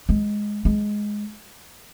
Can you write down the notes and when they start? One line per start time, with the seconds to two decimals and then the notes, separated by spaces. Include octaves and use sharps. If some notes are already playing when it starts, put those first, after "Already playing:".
0.09 G#3
0.65 G#3